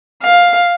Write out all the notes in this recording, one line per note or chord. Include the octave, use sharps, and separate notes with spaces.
F5